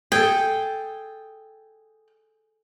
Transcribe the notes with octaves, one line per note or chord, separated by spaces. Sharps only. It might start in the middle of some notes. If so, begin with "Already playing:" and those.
G#4 A4 G5